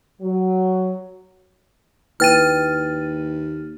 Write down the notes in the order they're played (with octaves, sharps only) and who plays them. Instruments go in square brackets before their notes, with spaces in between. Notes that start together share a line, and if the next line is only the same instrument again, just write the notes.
[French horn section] F#3
[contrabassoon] D#2 [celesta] E4 B4 G5 [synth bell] F6 A6 D#7